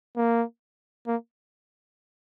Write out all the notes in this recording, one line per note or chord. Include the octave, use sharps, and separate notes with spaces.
A#3
A#3